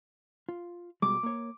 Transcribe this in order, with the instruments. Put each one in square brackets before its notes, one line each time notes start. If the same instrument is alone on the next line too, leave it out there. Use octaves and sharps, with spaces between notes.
[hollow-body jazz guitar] F4
[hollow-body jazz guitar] B2 G3 G#3 [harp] D6
[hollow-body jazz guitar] A#3 C#5